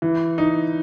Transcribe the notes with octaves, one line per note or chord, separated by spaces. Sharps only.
E3
D#4